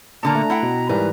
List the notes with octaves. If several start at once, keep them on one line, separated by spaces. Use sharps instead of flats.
A#2 D3 A#3 A#5
A3
E4 F#5 G5
B2
G#2 E3 G3 A#4 B4